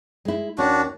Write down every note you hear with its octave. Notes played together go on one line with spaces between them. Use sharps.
G#3 E4
D#2 C#4 D4 F#4